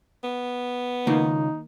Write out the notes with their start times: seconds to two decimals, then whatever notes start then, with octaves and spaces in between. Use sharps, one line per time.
0.24 B3
1.07 C#2 D#3 A#3 D#4